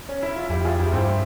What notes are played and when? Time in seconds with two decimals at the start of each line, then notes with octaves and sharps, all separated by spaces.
0.09 C#4
0.22 E4
0.36 F4
0.50 F2 E4 G4
0.65 F4 G#4
0.79 E4 G4
0.92 G2 C4 E4